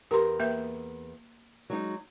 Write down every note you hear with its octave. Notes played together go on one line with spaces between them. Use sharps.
E2 G4 A#4 C6
A#3 B4 E5
F#3 G#3 D#4